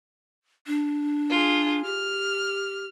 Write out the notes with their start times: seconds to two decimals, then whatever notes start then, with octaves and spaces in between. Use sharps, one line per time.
0.67 D4
1.30 F4 G#4
1.85 G4 F6